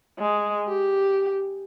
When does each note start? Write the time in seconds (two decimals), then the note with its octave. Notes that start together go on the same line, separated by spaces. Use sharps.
0.19 G#3
0.68 G4